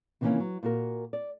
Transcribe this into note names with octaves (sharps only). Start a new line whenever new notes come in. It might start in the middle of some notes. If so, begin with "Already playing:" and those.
C3 D#3 E3 G3 A#3 C#4
F#3
A#2 F#4 A#4
D5